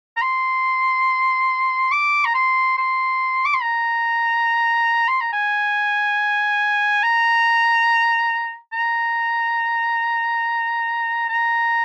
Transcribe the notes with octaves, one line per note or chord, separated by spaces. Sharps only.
A#5
C6
D6
A#5
C6
C6
D6
C6
A#5
C6
A#5
G#5
A#5
A#5
A#5